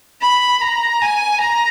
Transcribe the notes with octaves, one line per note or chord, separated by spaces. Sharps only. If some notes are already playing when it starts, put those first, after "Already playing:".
B5
A#5
G#5
A#5